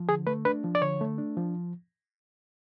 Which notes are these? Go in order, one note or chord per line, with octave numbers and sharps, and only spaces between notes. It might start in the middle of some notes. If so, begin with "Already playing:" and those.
Already playing: F3
D3 G#4
A3 B4
D4 B4
F3
D5
D3 C#5
A3
D4
F3